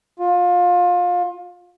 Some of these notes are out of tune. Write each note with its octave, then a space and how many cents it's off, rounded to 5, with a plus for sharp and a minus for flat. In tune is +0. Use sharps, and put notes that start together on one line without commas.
F4 +25